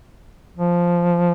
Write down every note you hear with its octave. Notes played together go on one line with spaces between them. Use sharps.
F3